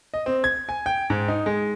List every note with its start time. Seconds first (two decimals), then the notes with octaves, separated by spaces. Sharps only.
0.14 D#5
0.26 C4
0.44 G#6
0.69 G#5
0.86 G5
1.10 G#2
1.28 D#4
1.46 G#3